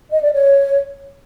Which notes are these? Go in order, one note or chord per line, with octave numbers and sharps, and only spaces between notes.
D#5
D5
C#5